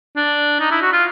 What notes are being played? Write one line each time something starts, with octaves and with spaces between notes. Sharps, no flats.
D4
D#4
E4
F#4
F4